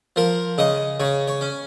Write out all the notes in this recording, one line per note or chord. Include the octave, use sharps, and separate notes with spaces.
F3 A#4
C#3 D#5
C#3 C#5
C#5
C#4